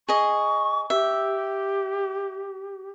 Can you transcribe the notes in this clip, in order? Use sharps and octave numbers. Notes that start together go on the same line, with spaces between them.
G#4 D#5 C#6
G4 E5